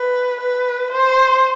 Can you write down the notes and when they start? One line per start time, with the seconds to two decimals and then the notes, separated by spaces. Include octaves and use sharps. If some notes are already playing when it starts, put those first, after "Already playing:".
Already playing: B4
0.41 B4
0.92 C5